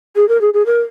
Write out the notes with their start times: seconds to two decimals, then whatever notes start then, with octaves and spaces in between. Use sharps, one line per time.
0.16 G#4
0.29 A#4
0.41 G#4
0.54 G#4
0.66 A#4